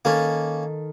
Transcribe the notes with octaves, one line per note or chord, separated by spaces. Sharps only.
D#3 A#3 C#4 A4